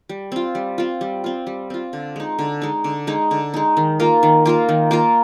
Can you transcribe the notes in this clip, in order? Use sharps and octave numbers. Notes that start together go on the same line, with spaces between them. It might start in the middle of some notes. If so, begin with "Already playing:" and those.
G3
C4 F4
G3
C4 F4
G3
C4 F4
G3
C4 F4
D3
G#3 D#4
D3
G#3 D#4
D3
G#3 D#4
D3
G#3 D#4
D#3
A#3 F4 A#4
D#3
A#3 F4 A#4
D#3
A#3 F4 A#4